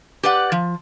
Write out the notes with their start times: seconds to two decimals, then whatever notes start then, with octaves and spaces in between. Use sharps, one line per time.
0.23 G4 B4 D5 F#5
0.52 F3